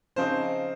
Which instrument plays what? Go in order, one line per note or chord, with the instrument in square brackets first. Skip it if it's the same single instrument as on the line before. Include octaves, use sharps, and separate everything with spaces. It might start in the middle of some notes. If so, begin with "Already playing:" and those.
[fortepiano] C#3 F3 C4 D#4 [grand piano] C5